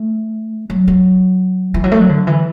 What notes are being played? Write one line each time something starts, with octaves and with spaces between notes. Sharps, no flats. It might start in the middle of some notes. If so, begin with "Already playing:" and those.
Already playing: A3
F#3
F#3
E3
F#3
A3
F#3
D3
E3